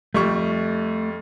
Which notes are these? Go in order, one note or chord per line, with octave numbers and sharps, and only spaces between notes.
F2 G3 A3 C#6